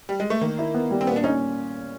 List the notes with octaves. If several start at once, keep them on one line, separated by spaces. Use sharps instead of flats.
G3
G#3
A3
D#3 A#3
E4
B3
G3
C4
A#2 B3
D4
C#4 D#4